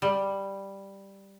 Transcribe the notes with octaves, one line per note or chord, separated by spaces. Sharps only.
G3